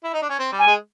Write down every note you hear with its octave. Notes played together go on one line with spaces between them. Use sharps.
E4
D#4
D4
C#4
C4
G3
G#5
G#3